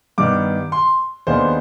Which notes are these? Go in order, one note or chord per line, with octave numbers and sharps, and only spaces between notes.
G2 D#3 B3 D6
C6
D#2 D#3 G#3 B3 D4 C5